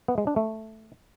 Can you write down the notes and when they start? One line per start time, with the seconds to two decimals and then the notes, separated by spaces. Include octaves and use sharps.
0.08 B3
0.18 G#3
0.27 D4
0.36 A3